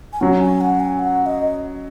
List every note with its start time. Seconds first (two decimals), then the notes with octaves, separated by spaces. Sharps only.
0.13 G#5
0.21 F#3 C#4 F#5
0.40 G#5
0.61 F#5
0.80 G#5
0.99 F#5
1.26 D#5